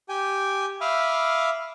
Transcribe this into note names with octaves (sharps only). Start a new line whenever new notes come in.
G4 G5 G#5
E5 F5 B5 D6 D#6 F6